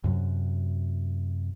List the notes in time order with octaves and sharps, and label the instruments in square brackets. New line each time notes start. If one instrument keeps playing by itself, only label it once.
[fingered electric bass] F#2 C3 F#3